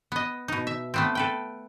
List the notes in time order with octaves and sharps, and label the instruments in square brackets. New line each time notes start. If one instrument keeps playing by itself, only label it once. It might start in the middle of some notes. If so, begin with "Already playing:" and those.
[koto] B3 D#5
B2 D#4
E5
A3 B3 C4
A4 B4 G5